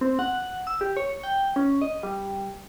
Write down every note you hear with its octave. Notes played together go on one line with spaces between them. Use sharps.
C4
F#5
E6
G4
C#5
G5
C#4
D#5
G3